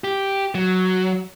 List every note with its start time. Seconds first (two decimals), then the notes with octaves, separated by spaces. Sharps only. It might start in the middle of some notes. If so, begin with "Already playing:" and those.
0.04 G4
0.55 F#3